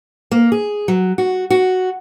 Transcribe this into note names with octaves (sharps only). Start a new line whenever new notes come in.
A#3
G#4
F#3
F#4
F#4